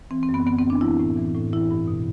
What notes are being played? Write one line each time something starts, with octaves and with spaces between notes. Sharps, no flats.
E3 C4
C4
F#2
B3
D3 B3
F#2 C4
D4
E3 E4
A2
E3
A2
E3 E4
G2
B2